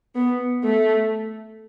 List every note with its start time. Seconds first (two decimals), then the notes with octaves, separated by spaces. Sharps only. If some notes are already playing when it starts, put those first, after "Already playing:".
0.15 B3
0.63 A3